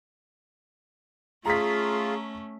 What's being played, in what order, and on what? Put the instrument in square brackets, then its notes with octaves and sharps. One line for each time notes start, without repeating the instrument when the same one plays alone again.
[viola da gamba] A3 C#4 [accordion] F4 [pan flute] G#4 [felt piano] A#5 B6